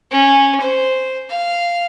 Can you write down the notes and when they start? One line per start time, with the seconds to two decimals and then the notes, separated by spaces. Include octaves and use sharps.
0.11 C#4
0.61 C5
1.30 F5